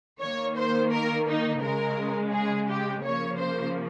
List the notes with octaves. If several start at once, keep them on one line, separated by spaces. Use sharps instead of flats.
D#3 A#3 C#5
C5
A#4
D#4
C#3 G#3 A#4
G#4
G4
C#3 F3 A#3 C#5
C5